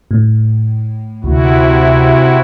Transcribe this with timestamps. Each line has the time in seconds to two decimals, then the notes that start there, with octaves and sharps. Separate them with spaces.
0.11 A2
1.24 D2 C3 E4 F#4